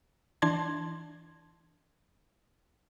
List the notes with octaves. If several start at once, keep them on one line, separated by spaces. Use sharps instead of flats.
E3 D4 A5 C6 G#6